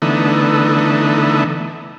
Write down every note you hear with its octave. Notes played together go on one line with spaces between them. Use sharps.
D3 E3 A3 B3 D#4